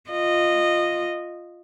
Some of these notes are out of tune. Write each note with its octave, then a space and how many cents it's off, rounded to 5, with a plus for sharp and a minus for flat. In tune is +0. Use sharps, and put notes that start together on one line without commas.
F4 +0 D#5 -15